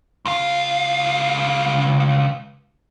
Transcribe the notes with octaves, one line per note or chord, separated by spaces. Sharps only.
C#2 F5